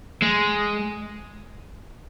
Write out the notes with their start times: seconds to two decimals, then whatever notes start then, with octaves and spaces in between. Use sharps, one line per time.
0.22 G#3